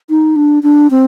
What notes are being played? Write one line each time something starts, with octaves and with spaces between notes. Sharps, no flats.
D#4
D4
D4
C4